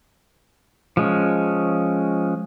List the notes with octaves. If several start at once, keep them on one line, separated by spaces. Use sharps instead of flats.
F3 G#3 C#4